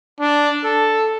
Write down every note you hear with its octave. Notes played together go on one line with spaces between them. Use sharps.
D4
A4